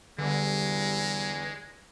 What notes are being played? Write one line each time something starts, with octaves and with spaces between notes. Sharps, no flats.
E2 D3 E3 G3 G#3